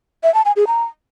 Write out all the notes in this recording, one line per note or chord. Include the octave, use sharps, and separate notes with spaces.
E5
A5
G#5
G#4
A#5